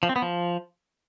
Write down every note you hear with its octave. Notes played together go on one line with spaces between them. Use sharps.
F3
C4
B3
F3